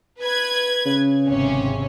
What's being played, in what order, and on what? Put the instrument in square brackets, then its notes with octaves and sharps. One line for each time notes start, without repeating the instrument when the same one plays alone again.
[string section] B4 G#6
[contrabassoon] C#3
[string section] G#1 C3 C#4